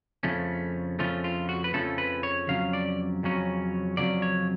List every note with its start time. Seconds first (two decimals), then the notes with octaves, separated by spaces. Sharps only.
0.23 F2 C#3 F3 A3 C#4
0.99 F2 C#3 F3 A3 C#4 F4
1.24 F4
1.49 F#4
1.64 B4
1.74 F2 C#3 F3 A3 C#4 A4
1.98 B4
2.23 C#5
2.48 F2 C#3 F#3 C#4 F5
2.73 D5
3.23 F2 C#3 F#3 C#4
3.97 F2 C#3 F#3 C#4 D5
4.22 C#5